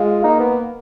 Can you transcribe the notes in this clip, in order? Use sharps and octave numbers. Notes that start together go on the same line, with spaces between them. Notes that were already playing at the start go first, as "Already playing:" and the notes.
Already playing: G#3 F4
A#3 D#4
B3